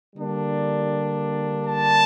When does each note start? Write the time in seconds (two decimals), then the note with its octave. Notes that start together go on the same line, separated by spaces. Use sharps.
0.15 D3 G3 A#3 D4
1.67 A5